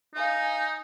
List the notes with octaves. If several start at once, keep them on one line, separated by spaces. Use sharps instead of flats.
D#4 F5 G#5